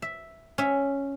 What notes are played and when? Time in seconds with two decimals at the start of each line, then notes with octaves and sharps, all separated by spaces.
0.02 E5
0.58 C#4 E5